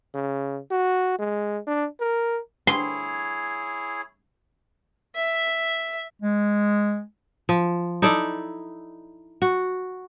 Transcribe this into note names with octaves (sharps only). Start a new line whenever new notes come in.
C#3
F#4
G#3
D4
A#4
E4 G#4 C#5 C6
E5
G#3
F3
D#4 E4 A4 D5
F#4